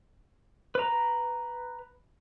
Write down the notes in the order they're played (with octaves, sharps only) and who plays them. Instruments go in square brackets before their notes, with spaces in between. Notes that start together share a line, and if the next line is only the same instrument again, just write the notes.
[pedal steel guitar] B4 A#5